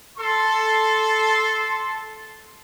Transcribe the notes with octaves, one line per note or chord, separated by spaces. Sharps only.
A4 C6